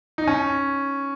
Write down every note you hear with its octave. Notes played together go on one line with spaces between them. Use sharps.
D#4
C#4